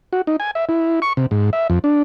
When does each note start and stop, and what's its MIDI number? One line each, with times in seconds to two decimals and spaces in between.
0.13 0.22 66
0.27 0.36 63
0.40 0.51 80
0.55 0.65 76
0.69 1.00 64
1.02 1.13 85
1.17 1.26 48
1.31 1.50 44
1.53 1.67 76
1.70 1.79 41
1.84 2.03 62